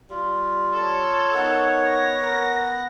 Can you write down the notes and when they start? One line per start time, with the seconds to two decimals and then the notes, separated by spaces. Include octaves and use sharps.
0.10 G3 F4
0.74 A4 C#5
1.35 D#3 B3 F#5
1.88 A#6
2.22 A#4